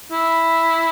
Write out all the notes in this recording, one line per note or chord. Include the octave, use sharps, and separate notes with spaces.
E4